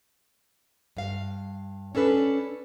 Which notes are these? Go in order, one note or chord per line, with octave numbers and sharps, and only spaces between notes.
G2 F5
C#4 D4 A4 B4